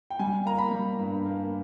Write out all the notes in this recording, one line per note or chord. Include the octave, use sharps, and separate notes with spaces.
G5
G3 G#5
A#3 A#5
B5
G3
G2
A#3